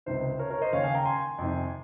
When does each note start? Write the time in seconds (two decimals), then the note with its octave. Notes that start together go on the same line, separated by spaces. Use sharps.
0.06 C#2 C3 D#3 C5
0.39 A#4 C#5
0.50 A#4 C#5
0.62 C5 D#5
0.73 D#2 C#3 C#5 F5
0.84 F5 G#5
0.95 G5 A#5
1.06 G#5 C6
1.38 F2 C3 D#3